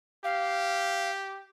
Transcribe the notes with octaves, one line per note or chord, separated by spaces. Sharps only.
G4 F5